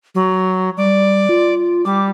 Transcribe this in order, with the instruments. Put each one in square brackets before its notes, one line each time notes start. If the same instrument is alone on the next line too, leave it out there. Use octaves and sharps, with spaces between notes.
[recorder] F#3
[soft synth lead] G3 [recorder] D5
[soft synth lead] F4
[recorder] G3 [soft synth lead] D6